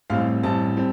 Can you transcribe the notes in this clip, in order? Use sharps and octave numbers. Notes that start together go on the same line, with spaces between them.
A1 A2 G3 C4 F5
A1 A2 G3 C4 A5
G3 C4